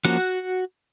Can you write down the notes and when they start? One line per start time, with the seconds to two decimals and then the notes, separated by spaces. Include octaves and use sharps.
0.05 F3 A#3 C#4 F#4 F#5